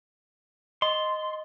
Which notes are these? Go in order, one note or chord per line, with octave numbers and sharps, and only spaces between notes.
D#5 C6